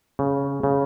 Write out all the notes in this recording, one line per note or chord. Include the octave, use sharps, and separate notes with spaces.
C#3
C#3